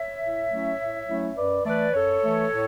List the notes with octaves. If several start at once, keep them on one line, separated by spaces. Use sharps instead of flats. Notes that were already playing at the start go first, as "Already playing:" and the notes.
Already playing: C#5 E5
A2
F#3 A3 C#4 E4
A2
F#3 A3 C#4 E4
F#2 B4 D5
E3 A3 B4 D5
F#2 A4 C#5
E3 A3
A2